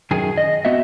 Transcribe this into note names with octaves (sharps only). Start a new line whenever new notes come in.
F#2 D#3 G#4
D#5
B3 F#4 D#5 E5